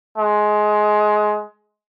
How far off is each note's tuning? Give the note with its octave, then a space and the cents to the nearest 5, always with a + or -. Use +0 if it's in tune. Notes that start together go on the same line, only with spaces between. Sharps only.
G#3 +20